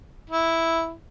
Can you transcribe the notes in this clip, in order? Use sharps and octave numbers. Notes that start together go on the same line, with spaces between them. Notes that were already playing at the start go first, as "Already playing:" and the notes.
E4